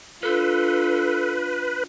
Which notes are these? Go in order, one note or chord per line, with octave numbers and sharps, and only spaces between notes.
D4 F4 A4 B4